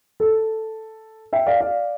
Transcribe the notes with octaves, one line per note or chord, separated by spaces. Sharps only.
A4
E5 G5
D5 F5
D5 F5